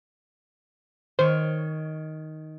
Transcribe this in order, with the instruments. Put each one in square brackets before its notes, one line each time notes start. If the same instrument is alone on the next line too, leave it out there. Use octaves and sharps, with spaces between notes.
[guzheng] D#3 C#5 [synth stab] C5